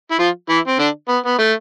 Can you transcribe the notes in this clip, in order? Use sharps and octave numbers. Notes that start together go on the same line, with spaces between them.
E4
F3 F4
E3 E4
C4
D3 D4
B3
B3
A3